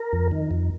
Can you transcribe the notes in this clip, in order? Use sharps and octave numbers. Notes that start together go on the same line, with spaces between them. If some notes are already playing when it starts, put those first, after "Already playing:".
Already playing: A#4
F2
D#3
F2